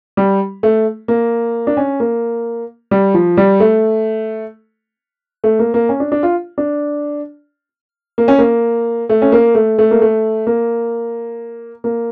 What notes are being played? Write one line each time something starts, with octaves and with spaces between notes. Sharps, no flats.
G3
A3
A#3
D4
C#4
A#3
G3
F3
G3
A3
A3
A#3
A#3
C#4
D4
D4
F4
D4
A#3
C#4
A#3
A3
C#4
A#3
A3
A3
A#3
A3
A#3
A#3